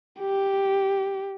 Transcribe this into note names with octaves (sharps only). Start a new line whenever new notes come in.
G4